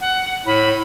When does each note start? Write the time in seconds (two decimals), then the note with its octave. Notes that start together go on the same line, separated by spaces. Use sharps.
0.01 F#5
0.46 A2 B5